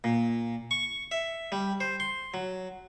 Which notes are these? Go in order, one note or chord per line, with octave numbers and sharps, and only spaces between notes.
A#2
C#6
E5
G3
C5
C6
F#3